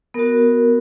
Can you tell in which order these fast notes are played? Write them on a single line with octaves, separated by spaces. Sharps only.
B3 A#4 F#4